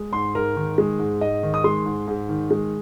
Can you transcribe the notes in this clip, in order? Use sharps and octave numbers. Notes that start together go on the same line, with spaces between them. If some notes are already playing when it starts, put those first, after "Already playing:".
Already playing: G#3
G#2 C6
G#2 A#4
D#3
G#3
G#2
G#2 D#5
D#3
D#6
G#3 C6
G#2
G#2
D#3
G#3